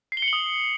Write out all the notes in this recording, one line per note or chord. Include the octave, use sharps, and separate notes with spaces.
C7
G7
C#7
F#7
D#6